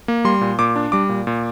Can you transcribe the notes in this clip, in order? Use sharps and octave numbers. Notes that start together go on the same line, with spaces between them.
A#3
G3 C6
A#2
A#2 D6
D4
G3 D6
A#2
A#2